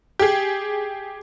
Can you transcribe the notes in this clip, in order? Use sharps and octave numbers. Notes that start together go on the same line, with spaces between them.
G4 G#4